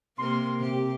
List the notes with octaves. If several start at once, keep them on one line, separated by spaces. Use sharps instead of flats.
C3 A#3 A#4 C6
C3 G4